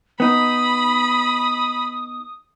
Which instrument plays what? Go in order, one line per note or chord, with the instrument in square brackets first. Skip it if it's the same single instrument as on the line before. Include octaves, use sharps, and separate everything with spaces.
[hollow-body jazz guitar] B3 D#4 [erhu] B5 [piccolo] D#6